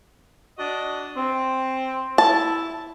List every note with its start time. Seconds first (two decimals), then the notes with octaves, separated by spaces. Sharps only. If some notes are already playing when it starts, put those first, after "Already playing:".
0.59 D4 F#4 D#5
1.16 C4
2.18 E4 A5